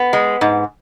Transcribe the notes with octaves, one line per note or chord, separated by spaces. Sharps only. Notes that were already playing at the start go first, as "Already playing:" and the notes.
Already playing: B3
G#3
G#2